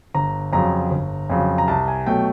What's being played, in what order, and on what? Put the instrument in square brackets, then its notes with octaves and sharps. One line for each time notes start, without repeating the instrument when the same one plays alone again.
[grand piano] G1 A#5
F2 C#3 F#3 A#5
G1
F2 C#3 F#3
A#5
C2 A5
G#5
B2 F#3 A3 G5